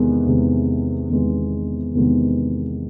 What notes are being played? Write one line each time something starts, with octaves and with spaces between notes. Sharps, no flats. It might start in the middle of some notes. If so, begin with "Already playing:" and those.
Already playing: E2 C3 D#3 G#3 B3
E2 C3 D#3 G#3 B3
E2 C3 D#3 G#3 B3
E2 C3 D#3 G#3 B3